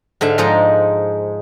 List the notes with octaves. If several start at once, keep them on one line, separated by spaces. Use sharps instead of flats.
G#2 D3 E5 F5
G#2 F3 G#3 D#4 A#5